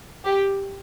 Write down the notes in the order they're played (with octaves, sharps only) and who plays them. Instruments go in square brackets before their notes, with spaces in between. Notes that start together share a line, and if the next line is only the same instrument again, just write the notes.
[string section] G4